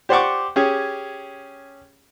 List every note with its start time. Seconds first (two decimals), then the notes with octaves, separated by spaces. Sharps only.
0.09 G4 C5 D5 F#5 C#6 D6
0.56 C#4 G4 G#4